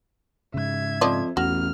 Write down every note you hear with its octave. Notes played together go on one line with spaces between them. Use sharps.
G#2 C#3 E5 G#6
F2 F3 D5 D#5
A1 E2 F#4 F6